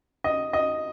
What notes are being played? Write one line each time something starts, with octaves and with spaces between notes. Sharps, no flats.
D#5
D#5